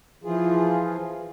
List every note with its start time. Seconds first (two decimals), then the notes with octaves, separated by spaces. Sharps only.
0.24 E3 F3 F4 G#4